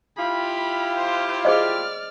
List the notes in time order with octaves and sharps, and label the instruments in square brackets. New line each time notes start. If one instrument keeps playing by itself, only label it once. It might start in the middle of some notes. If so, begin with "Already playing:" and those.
[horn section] E4 F4 G4 [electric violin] B5
[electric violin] C5
[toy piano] G#4 C5 D#5 [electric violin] D5 F6